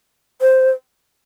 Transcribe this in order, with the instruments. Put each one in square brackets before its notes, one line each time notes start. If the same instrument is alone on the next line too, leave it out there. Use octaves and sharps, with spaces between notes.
[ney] C5